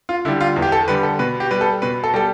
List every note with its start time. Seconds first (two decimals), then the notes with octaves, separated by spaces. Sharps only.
0.09 F4
0.25 D3 E4
0.28 G3
0.41 F4
0.56 E2
0.62 G4
0.72 A4
0.88 D3 G3 B4
1.03 A4
1.19 B2 B4
1.40 G4
1.51 G3 B4
1.61 A4
1.82 B2 B4
2.04 A4
2.14 G3 A4